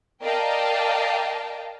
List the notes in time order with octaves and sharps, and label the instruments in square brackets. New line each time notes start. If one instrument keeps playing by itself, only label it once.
[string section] A#4 D5 D#5 F5 G5 A5